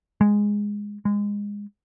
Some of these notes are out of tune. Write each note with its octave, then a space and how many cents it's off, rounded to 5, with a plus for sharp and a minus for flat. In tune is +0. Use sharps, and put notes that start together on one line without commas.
G#3 -10
G#3 -20